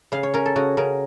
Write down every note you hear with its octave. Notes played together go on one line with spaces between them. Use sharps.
C#3 F5
C#5
C#4 A#4
A4
C#3 F#4
C#3 A#4